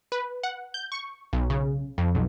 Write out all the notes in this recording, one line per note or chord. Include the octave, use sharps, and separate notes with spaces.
B4
F#5
G6
C#6
B1
C#3
F2
B1